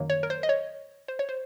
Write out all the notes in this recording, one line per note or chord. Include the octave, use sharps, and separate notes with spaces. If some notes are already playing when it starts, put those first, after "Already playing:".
Already playing: F#2 D#3 F#3 A#3
C#5
A#4
C5
D#5
C#5
C5
C#5
C5